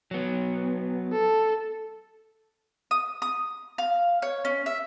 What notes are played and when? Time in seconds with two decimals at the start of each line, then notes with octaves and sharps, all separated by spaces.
0.11 F#3 B3
1.12 A4
2.91 D#6
3.22 D#6
3.78 F5
4.22 C#5
4.45 C#4
4.66 E5